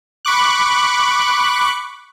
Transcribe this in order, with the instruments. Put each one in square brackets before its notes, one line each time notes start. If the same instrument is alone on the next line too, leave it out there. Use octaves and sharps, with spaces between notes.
[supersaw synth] B5 C#6 D6 F#6